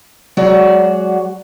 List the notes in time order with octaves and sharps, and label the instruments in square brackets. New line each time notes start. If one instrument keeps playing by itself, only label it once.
[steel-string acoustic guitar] F#3 G#3 F#4 D5